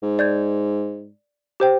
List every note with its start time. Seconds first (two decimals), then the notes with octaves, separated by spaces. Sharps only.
0.03 G#2
0.19 D5 G6 G#6
1.60 G4 C5 G5